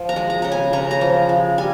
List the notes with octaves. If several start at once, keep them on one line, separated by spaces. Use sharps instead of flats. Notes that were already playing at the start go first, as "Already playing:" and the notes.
Already playing: F3
A#5
G#3
A#5
C#3 A#5
G#5
C#3 A#5
A#5
F3
G#3
G3 G#5